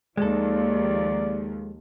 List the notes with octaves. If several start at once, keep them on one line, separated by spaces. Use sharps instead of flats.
D#2 F3 G#3 A4 D5